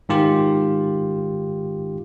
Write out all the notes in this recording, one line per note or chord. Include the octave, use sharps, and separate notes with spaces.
G#2 D#3 F4 G4